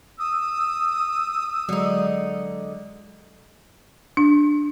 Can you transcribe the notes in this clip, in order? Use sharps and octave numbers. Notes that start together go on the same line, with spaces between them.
D#6 E6
D3 F#3 G#3 D#4
D4